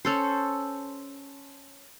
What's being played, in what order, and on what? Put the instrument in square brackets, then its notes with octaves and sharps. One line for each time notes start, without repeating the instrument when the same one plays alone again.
[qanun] C#4 A4 C5